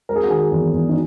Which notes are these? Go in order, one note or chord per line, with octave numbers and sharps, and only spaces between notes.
G#3 A#4
G#4
F#4
D#3 G#4
E2
E2
D#4